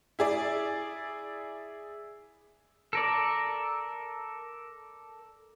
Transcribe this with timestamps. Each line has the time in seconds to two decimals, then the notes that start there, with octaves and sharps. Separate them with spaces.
0.19 E4 G#4 D5
2.93 A4 A#4 D5